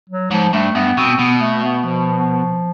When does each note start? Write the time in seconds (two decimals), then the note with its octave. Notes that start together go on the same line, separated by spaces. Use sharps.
0.09 F#3
0.31 G#2 F3
0.53 G2 A3
0.75 G2 B3
0.97 B2 C4
1.18 B2 B3
1.40 A3
1.63 B3
1.84 F3